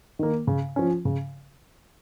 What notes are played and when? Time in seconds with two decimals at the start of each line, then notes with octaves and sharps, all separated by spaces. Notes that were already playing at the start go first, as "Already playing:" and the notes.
0.19 D#3 A#3
0.47 C#3
0.76 F3 C#4
1.05 C#3